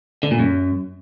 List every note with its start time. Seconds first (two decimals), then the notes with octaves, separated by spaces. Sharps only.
0.23 D3
0.31 A#2
0.39 F#2